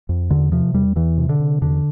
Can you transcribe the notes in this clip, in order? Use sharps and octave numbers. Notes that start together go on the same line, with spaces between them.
F2
E2 D3
C3 F3
E2 G3
E2 E3
C3
D3
C3
E2 D3